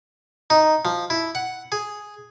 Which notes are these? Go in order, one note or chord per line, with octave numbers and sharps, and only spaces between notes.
D#4
F3
E4
F#5
G#4